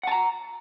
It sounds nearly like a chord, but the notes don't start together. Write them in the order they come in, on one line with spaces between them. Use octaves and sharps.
F#5 A5 A#5